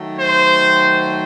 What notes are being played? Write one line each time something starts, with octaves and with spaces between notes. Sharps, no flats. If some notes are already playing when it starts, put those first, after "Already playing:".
Already playing: D#3 F#3 A3
C5